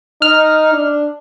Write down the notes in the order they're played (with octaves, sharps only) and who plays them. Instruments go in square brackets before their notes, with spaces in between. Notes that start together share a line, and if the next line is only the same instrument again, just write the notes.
[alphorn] D#4 [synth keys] F6
[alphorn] D4